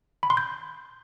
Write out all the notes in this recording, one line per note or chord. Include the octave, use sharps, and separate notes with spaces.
B5
C6
G6